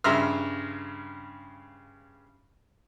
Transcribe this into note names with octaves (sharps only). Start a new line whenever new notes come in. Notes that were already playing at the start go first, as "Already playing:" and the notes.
G2 C#3 E5 A#5 C6 F6